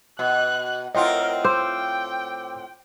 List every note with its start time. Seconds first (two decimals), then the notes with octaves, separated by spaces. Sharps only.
0.19 B2 F#6
0.95 A2 C4 F4 A#4 D#5 F#5
1.44 C5 G5 D6 E6